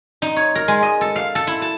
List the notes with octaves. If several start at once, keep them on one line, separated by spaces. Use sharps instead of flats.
D#4
C#5
A#4
G#3
D#5
A4
F5
A4
E4
A5